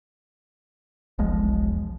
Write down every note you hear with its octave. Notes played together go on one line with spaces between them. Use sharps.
E1 B1 F3 G#3